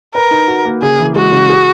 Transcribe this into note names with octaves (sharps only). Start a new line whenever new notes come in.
A#4 B4
D#4
F#4
A#3
C#3 G#4
E3
G#3 F#4
C#3
G#4